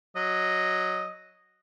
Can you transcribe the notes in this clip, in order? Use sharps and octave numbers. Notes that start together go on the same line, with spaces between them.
F#3 D#5